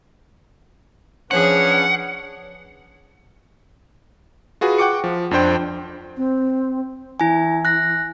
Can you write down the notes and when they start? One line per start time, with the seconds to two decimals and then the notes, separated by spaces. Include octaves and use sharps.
1.31 F3 C#4 D4 G#4 B4 C#5 F#5
4.61 F4 F#4 G#4 B4
4.78 F#5 G5 C#6 D6 C#7
5.04 F3
5.31 F2 C4 D4 C5 G5
6.17 C4
7.20 E3 E4 G#5
7.65 F#6 A#6